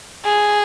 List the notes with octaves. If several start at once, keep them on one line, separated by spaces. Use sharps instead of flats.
G#4